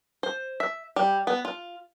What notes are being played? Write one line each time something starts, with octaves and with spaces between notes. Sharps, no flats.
C5
E5
G3
B3
F4